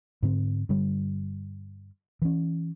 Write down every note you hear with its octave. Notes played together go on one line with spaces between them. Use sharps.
G#2 D3 C4
G2 D3 G3
E3 C#4